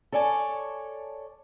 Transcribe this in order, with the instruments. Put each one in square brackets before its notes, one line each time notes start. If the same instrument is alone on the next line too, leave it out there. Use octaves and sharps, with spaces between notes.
[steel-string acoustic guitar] A4 C#5 D5 G#5 A5